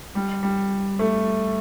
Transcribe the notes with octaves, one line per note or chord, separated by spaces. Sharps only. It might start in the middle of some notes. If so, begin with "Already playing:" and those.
G3
G3
A3